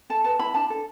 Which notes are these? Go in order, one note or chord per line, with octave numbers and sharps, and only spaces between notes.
A4 A5
B4 A5
E4 B5
D4 A5
A4